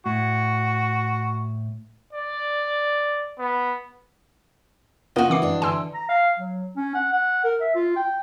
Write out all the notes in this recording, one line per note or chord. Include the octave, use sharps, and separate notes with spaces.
A2 F#4
D5
B3
C#3 A#3 B3 F4 F#4 A#4 D#5
E3 C4 D6 C7
G2 D4
D3 G#5 C6 E6
A#5
F5
F#3
C#4
F#5
F#5
A#4
E5
F4
G5